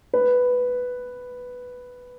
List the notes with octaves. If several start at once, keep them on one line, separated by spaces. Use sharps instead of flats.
B4